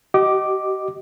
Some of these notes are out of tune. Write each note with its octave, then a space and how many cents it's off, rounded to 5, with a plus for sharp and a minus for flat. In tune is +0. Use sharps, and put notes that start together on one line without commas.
G4 -45 D#5 +0 D6 +0